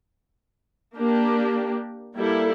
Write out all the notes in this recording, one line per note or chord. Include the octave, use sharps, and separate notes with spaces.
A#3 D4 G4
G3 A#3 E4 A4